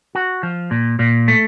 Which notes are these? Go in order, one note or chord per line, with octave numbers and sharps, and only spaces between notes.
F#4
F3
A#2
A#2
A3